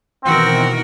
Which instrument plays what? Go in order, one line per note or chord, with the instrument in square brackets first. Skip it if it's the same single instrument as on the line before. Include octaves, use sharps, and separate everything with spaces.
[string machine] B2 D#3 E3 [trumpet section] C4 [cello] F#4 A#4